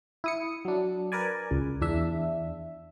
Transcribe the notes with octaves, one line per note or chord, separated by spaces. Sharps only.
E4 D#6 C#7
F#3 D4
A#4 B4 D5 G#5
C#2
E2 D4 E5